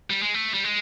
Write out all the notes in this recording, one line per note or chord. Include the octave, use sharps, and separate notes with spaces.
G3
G#3
A3
G3
G#3